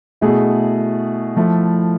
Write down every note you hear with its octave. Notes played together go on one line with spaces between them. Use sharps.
B2 A3 E4 G#4
F3 A3 E4